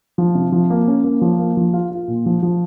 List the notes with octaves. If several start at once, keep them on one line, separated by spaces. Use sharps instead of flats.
F3
C3
F3
A#3
C#4
A#3
F3
A#3
F3
F4
F4
A#2
F3
F3